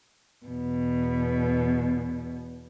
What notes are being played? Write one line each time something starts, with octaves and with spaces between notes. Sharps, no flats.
E2 B2